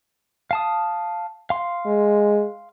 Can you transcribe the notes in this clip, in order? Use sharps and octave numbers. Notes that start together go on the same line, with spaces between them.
F5 A5 D#6
F5 C6
G#3